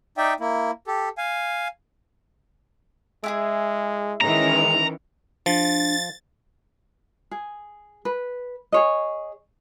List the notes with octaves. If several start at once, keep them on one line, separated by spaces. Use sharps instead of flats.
D#4 D5 E5 G5
A#3 E4
G4 A4
F5 G#5
G#3 E4 G4 G#4
D#3 E3 G#3 C#4 A#5
F3 D4 A6
G#4
B4
G#4 C#5 D#5